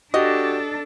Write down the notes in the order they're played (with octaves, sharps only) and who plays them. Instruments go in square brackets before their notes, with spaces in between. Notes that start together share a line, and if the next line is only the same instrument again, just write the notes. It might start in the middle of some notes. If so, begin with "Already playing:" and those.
[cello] D4 A4 [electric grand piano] F#4 G4 [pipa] D#5